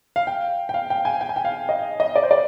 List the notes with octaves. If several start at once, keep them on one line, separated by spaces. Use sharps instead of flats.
F5
G5
G5
F5
G5
G#5
G5
G#5
G5
F5
D#5
D#5
D5
C5
D5